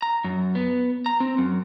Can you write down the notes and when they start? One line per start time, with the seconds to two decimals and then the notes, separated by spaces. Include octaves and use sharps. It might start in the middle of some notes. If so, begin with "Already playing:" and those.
0.02 A#5
0.24 F#2
0.55 B3
1.06 A#5
1.20 C4
1.38 F#2